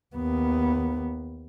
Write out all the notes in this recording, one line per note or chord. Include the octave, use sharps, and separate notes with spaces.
D#2 B3